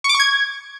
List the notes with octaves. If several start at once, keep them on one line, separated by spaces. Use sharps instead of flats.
C#6
D6
C#6
G#6